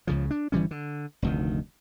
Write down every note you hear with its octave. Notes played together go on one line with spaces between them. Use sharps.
C#2 C#3 F3
D4
G1 E3 G3 C#4
D3
F1 D2 D#3